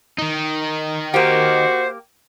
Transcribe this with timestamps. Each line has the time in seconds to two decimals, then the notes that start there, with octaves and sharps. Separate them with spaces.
0.18 D#3 D#4
1.14 A#3 F#4 G4 C5